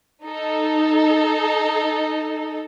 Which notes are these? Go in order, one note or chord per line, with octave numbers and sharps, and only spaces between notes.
D#4 A4